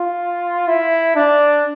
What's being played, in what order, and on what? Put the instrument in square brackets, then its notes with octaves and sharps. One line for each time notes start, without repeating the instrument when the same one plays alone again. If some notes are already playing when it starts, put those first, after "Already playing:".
Already playing: [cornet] F4
E4
D4